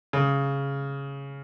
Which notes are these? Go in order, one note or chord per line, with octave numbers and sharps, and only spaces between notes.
C#3